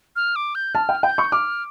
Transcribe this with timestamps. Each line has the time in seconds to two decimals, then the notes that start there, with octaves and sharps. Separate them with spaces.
0.16 F6
0.36 D6
0.55 G6
0.74 A5 F6
0.89 G5
1.03 G5 G6
1.18 C#6
1.32 D6 F6